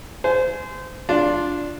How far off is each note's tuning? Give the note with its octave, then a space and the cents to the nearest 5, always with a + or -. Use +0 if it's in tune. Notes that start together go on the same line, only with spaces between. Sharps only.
C5 -25 G#5 +15
D4 -5 F4 +0